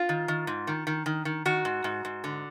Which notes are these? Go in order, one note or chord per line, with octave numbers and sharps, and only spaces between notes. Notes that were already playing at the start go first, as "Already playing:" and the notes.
Already playing: F4
D#3
D#3
G#2
D#3
D#3
D#3
D#3
D#3 F#4
G#2
G#2
G#2
D3